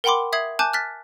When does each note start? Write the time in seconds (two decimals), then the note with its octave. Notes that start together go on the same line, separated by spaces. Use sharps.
0.04 A#4 F#5 G5 B5 C6 D6
0.33 E5 D#6 G#6 C7 F#7
0.59 G#5 A5 D6 F#6 G6
0.73 F6 F#6 A6 B6